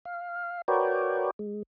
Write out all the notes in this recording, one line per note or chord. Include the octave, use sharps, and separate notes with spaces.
F5
F#4 A#4 B4 C#5 D5 G5
G#3